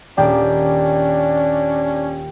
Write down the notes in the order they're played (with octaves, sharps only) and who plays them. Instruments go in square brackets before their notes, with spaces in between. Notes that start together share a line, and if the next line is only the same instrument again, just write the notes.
[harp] D#1 A#3 D6 [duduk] C#4 [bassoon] D4 [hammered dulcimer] G4